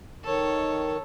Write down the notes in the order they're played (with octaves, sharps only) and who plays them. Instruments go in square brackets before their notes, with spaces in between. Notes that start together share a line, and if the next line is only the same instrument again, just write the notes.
[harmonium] D#3 [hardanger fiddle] A4 C#5